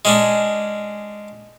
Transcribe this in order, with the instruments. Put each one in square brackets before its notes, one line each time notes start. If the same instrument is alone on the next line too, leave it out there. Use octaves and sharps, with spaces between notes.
[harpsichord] G#3 C#4 D4